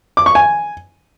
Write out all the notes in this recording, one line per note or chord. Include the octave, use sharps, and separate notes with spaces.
D6
C#6
G#5